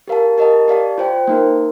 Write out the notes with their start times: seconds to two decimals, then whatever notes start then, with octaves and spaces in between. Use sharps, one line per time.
0.08 G4 A#4 F5 A5
0.38 G4 A#4 D#5 A5
0.68 G4 D5 F5 A5
0.98 F4 C5 G5
1.28 A#3 D#4 A#4